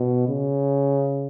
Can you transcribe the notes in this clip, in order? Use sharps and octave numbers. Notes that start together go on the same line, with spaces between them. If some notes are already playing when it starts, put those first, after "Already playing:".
Already playing: B2
C#3